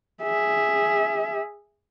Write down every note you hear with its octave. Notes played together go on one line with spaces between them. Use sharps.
G#4 E5